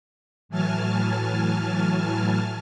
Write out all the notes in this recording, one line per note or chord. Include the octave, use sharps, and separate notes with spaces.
A2 E3 F#3 G#5 A5 F6